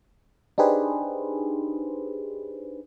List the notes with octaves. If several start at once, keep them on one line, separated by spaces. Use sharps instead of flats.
D4 D#4 G4 G#4 B4 C5